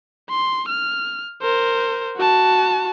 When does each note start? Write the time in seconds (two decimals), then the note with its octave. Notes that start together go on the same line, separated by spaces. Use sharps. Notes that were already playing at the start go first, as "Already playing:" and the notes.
0.29 C6
0.68 F6
1.42 A#4 C5
2.17 F#4 A5